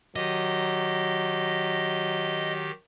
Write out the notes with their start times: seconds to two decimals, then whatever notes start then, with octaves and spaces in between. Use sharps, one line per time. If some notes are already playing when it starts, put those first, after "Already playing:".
0.16 D#3 F#3 G4 D#5